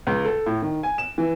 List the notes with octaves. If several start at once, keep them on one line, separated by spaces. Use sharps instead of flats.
C#2
A4
A2
D#3
G#5
E7
E3